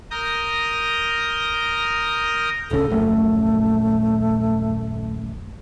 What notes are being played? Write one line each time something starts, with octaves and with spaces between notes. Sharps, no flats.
A#4 D#6 F6 G6 A#6
D1 C#3 A4
D#1 A#1 F#2 A3